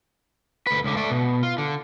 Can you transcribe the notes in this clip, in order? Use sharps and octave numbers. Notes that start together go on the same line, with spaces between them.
D2 B4
C#2 D3
A3 D5
B2
F4
D3